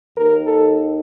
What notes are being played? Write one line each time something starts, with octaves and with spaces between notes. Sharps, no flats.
D#2 D#3 A#4
A4